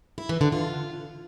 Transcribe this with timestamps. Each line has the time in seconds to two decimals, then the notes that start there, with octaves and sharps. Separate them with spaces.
0.18 E4
0.29 E3
0.41 D3
0.52 F4